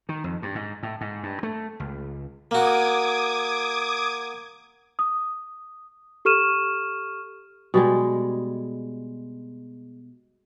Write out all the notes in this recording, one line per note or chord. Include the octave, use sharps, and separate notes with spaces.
D#3
F2
G2
G#2
A2
G#2
G2
A3
C#2
A#3 F#4 D6 D#6 G#6
D#6
G4 A4 C#6 F6 D#7 E7
B2 G3 G#3